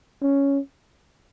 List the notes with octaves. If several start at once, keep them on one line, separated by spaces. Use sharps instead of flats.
C#4